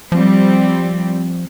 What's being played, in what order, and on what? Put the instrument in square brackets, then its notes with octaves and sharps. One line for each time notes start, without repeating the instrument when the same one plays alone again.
[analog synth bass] F3 [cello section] G3 C4